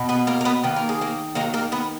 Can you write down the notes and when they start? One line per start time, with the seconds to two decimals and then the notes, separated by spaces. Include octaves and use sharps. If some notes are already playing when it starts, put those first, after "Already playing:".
Already playing: B2
0.09 B3 B4
0.27 A#3 A#4
0.41 A#4
0.45 B3 B4
0.64 D#3 A#3 B4
0.76 A#4
0.89 G#4
1.01 A#3 A#4
1.35 D#3 F#3 A#3 A#4
1.54 A#3 A#4
1.72 B3 B4